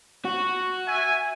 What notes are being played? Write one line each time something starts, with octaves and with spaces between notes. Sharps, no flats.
F#4
E5 G#5